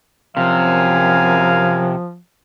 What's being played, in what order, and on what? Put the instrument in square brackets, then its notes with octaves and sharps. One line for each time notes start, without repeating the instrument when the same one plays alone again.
[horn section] F#2 A#4 G#5 [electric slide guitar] C3 [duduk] F3 [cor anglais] F5